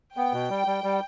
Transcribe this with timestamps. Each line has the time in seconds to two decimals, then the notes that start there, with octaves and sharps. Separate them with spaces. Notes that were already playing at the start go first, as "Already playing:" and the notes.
0.16 B3 G5
0.33 B2
0.50 G3
0.67 G3
0.84 G3